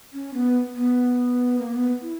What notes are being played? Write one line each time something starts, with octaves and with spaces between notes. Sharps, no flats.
C#4
B3
B3
A#3
B3
E4